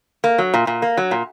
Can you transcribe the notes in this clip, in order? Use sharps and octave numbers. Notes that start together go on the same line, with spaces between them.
A#3
F#3
A#2
A#2
A#3
F#3
A#2